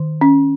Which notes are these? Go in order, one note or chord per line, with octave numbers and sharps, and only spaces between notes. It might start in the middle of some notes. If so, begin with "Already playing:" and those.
Already playing: D#3
C#4